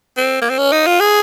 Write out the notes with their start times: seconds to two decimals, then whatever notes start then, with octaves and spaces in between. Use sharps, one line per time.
0.17 C4
0.41 A#3
0.50 C4
0.58 C#4
0.72 D#4
0.87 F4
1.00 G#4